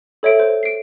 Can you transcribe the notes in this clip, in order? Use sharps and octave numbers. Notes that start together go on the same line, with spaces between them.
A4 C#5 E5 D7
C5
C7 D7